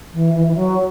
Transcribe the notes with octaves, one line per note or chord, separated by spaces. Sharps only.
E3
E3
E3
F#3